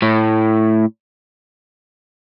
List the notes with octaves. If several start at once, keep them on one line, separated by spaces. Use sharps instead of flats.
A2